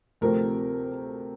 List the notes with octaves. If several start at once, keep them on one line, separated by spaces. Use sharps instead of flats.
D2 C3 F3 A3 C4 A#4